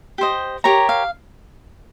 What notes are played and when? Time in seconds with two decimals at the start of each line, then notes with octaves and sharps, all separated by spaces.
0.18 G4 C5 D#5
0.64 G4 A#4 C#5 A#5
0.89 F5